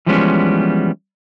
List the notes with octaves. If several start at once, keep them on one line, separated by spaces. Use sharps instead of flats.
E3 F3 G3 G#3 B3 C#4